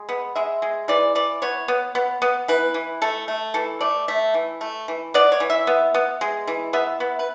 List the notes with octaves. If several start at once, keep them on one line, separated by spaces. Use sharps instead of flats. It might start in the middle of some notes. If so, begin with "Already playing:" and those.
Already playing: G#3
B3
G#3 E5
G#3
E3 D5
E3 D5
B3 C#5
B3
B3
B3
E3 B4
E3
A3 A4
A3
E3 A4
A3 D5
A3 E5
E3
A3
E3
B3 D5
C#5
E3
E5
B3
B3
G#3
E3
B3 E5
B3
B4